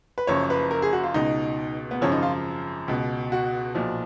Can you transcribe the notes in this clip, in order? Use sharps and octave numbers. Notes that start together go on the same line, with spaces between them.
B4
F#1 F#2 F3 C#5
B4
A#4
G#4
F#4
F4
C#2 B2 D#4
B3
G#1 F#2 C#3 F3 C#4
D#4
F4
C#2 B2
F#4
B1 A#2 F3